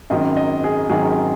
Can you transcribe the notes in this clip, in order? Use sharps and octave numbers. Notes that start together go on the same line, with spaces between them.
G#1 F#2 D#3 F#3 D#5
D#5
G#4
G#1 F#2 D#3 F#3 G#4